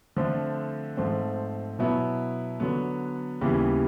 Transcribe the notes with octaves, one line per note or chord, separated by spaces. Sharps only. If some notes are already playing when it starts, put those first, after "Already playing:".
D3 F3 A3 C4
G#2 F3 A3 C4
B2 F#3 B3 E4
D3 F#3 B3
D#2 C#3 E3 G3 B3